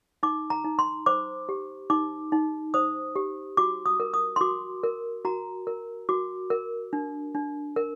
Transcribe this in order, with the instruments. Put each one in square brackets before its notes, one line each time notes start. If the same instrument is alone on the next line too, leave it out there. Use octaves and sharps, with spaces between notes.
[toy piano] D#4 D6
A#5
D#4
C6
C5 D6
G4
D#4 D6
D#4
C5 D#6
G4
F#4 D6
D#6
A#4
D#6
C6
F#4 D6
A#4
F#4 A#5
A#4
F#4 D6
A#4
D4
D4
A#4